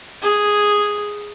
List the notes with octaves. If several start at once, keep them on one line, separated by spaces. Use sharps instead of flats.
G#4